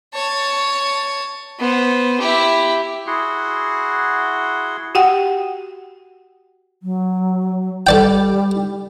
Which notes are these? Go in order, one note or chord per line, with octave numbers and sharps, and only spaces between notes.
C#5 A5
B3 C5
E4 G4
E4 F#4 G#4 F#5 C6
F#4 G4 F#5 G5
F#3
G3 A4 D5 G5